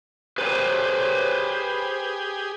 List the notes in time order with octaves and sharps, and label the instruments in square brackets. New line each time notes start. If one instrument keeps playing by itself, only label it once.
[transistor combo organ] G4 G#4 [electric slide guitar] B4 C5